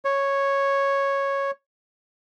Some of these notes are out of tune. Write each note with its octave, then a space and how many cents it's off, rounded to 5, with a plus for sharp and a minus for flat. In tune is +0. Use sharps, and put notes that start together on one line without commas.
C#5 -5